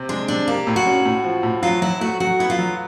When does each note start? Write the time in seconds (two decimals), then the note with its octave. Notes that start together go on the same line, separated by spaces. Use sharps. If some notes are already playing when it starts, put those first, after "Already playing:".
Already playing: C3
0.09 G#3 D4
0.28 C3 D4
0.47 A#3 G4
0.67 A2
0.76 F#4
0.87 C#4
1.05 A2
1.24 F3
1.43 A2
1.62 F#3 F4
1.82 F#3 E4
2.01 A3 F#4
2.20 F#3 F#4
2.39 B3 E4
2.50 F4
2.59 F#3